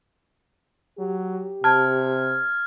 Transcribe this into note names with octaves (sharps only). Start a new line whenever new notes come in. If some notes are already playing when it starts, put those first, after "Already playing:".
F#3 G4
C3 A5 F6 G#6